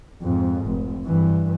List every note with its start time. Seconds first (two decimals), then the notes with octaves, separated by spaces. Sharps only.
0.22 F2 G#2
0.66 F1
1.05 G2 E3